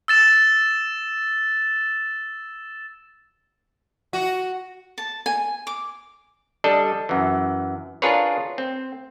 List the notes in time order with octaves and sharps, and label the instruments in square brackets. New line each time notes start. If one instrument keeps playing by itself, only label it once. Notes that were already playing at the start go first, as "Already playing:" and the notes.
[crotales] E6 A6 E7
[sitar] F#4
[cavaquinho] A5
G#5
D6
[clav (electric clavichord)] G3 D4 A4 D#5
F#2 E3
D4 F4 G#4 A#4 B4 C#5
C4